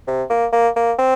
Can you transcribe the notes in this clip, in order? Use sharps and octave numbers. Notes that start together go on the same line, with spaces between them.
C3
A#3
A#3
A#3
C4